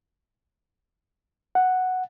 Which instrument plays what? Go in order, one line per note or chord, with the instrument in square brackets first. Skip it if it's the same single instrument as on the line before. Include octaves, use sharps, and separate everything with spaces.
[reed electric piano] F#5